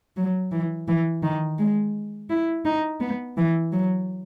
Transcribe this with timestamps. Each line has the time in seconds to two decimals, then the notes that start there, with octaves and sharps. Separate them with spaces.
0.16 F#3
0.52 E3
0.88 E3
1.23 D#3
1.59 G#3
2.30 E4
2.65 D#4
3.00 B3
3.37 E3
3.73 F#3